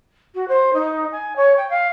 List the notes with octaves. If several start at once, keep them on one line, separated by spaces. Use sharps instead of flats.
F#4
C5
D#4
G#5
C#5
G5
F5